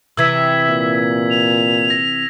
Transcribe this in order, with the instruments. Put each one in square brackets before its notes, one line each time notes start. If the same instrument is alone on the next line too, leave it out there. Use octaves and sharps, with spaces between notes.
[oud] C3 E3 [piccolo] E5 [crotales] E6 G#6 B6
[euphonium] A#2
[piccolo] F7
[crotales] A#6